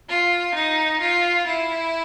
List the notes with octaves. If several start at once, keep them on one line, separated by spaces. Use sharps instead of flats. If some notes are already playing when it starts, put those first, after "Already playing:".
F4
D#4
F4
E4